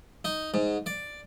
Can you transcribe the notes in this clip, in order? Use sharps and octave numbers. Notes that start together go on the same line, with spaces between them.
D#4
G#2
D5